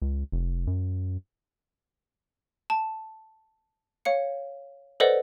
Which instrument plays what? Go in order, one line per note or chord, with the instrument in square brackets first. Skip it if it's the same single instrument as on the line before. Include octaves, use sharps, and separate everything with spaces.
[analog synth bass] C#2
F1
F#2
[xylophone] A5
C#5 F5 C#7
A4 B4 C5 D5 D#5 F#5